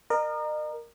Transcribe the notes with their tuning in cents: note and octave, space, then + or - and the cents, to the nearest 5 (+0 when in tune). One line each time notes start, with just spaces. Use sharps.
A#4 +0 D#5 -40